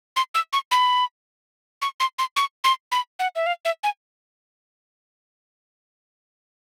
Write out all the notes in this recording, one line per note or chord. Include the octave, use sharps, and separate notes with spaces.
C6
E6
C#6
B5
C#6
C6
C6
C#6
C6
B5
F#5
E5
F5
E5
G#5